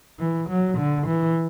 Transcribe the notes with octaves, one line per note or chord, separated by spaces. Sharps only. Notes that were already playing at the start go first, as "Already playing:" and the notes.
E3
F#3
D3
E3